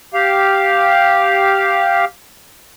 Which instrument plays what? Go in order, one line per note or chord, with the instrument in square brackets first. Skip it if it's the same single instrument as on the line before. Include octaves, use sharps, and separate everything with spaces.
[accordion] G4 F5